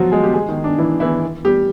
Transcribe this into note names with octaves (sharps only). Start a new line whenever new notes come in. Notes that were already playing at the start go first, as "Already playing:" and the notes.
Already playing: F3 F#3 F4 F#4
G#3 G#4
G4
G#3 G#4
D#3 D#4
D4
E3 E4
E3 E4
G3 G4